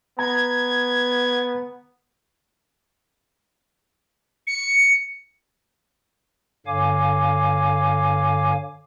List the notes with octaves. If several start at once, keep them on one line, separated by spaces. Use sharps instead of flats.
B3 A#5 G#6
C#7
G2 D3 C#5 F5 G#5 D6